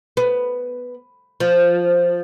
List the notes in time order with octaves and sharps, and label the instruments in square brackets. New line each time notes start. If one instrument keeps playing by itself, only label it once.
[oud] B3
F3